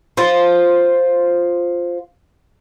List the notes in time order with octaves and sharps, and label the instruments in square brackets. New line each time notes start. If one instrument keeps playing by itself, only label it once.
[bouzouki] F4 C5